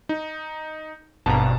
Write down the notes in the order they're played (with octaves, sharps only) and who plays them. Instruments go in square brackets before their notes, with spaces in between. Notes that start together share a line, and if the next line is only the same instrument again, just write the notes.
[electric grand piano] D#4
[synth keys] G#1 G2 B2 [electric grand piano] A5 A#5